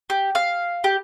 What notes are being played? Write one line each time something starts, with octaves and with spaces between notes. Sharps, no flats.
G4
F5
G4